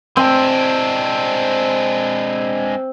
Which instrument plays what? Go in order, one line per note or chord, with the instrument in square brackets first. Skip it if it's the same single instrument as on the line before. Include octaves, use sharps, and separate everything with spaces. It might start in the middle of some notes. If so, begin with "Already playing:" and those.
[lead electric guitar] G#3 D4 [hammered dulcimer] C4